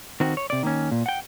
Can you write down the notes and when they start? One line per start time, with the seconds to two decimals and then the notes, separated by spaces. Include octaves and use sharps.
0.20 D#3 C4 F#4
0.37 C#5
0.50 C3 D5
0.63 D#3 A#3 C#4
0.92 A#2
1.06 F#5 G5